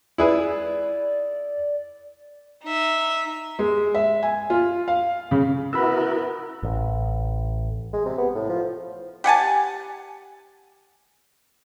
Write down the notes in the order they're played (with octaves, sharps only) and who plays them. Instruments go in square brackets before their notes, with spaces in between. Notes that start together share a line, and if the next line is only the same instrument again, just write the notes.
[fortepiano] E4 G#4 B4 [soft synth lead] D5
[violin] D#4 E5
[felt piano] G#3
E5
G#5
F4
F5
C#3
[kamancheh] B3 [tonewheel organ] E4 F#4 A#4 [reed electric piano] B5 E6
[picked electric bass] A1
[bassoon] G#3
C3
B3
A2
F3
[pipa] G4 F#5 G#5 A5